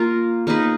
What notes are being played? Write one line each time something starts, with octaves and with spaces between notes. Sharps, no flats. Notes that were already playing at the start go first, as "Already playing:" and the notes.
Already playing: A#3 F4 A#4
A#3 D#4 G#4 B4